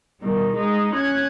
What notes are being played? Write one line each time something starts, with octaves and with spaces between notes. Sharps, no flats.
B2 D#3 G3
G#3 D#4 D#6
C#4 F#6 G#6